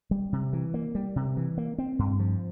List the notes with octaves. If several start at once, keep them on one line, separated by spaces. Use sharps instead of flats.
G3
C3
E3
A#3
G3
C3
E3
A#3
C4
G2
F3